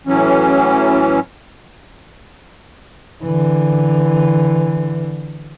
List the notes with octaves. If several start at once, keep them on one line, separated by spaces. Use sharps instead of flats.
A2 E3 F#3 C#4
D3 E3